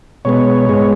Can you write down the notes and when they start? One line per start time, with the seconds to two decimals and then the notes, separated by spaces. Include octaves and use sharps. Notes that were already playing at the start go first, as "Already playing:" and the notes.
0.25 B2 G#3 B3 C#5
0.69 G#2 G#3 B3